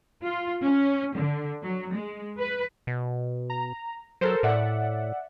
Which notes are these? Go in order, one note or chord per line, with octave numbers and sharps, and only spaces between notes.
F4
C#4
D3
F#3
G#3
B4
B2
A#5
F#3 A4 A#4 C5
A2 D5 E5 F#5